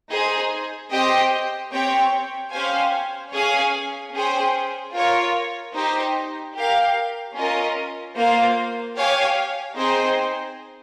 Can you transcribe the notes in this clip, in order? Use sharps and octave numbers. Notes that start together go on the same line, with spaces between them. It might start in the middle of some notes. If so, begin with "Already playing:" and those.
D#4 G#4 C5
C4 G4 C5 D#5 G5
C4 G4 C#5 G5
C#4 G4 C5 F5 G#5
C#4 G#4 C#5 F5 G#5
C#4 G#4 C5 G5
F4 A#4 C#5
D#4 G4 C5
G4 A#4 F5
C#4 F4 A#4 D#5
A#3 F4 C5 F5
G4 C#5 F5 G#5
C4 D#4 G#4 C5 G5